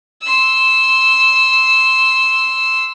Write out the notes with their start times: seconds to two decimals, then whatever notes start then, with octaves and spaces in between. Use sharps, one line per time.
0.22 C6 E6